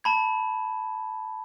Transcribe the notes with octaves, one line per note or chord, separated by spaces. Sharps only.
A5 B5 G#6